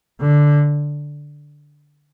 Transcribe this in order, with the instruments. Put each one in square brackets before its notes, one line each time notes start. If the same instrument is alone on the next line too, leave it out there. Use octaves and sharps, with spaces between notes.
[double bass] D3